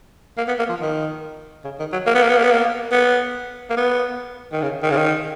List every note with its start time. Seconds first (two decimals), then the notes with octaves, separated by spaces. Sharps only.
0.37 A#3
0.48 B3
0.59 A#3
0.69 F3
0.81 D#3
1.64 C#3
1.79 D#3
1.93 F#3
2.07 A#3
2.15 B3
2.22 A#3
2.29 B3
2.37 A#3
2.43 B3
2.51 A#3
2.92 B3
3.70 A#3
3.77 B3
4.53 D#3
4.62 C#3
4.83 D#3
4.91 C#3
4.97 D#3